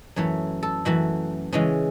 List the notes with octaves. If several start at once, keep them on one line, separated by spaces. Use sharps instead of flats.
F#2 E3 A3 C#5
A4
F#2 E3 A3 F#4
C#3 E3 G#3 C#4